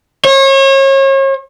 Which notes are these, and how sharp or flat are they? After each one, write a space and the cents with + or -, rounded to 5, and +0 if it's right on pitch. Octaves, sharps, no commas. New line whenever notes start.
C#5 -35